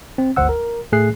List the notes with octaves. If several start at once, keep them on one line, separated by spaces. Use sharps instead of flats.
C4
G1 D2 C5 F#5 E6
A#4
A2 A3 G#4 F#6 C7